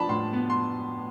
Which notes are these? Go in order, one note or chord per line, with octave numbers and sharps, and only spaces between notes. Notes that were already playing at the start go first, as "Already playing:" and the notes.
Already playing: F3 D4 A5 B5
A2 C6
B3
C6